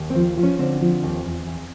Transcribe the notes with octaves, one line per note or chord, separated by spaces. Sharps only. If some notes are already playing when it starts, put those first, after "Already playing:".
Already playing: D#2
C4
F3
F3
C#4
D3 C4
F3
D#2
E2
E2